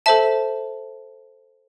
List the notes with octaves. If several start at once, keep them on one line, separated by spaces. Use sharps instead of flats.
A4 C5 E5 A5